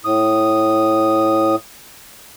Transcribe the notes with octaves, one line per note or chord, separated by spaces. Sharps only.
A2 D#6